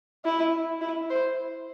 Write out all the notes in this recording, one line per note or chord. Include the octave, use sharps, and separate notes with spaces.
E4
E4
C5